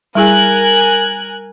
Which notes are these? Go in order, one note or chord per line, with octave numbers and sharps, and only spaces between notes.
G3 E4 G#4 A#4 G#5 F#6